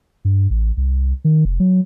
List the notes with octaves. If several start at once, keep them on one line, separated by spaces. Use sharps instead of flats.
G2
A1
C2
D#3
F1
F#3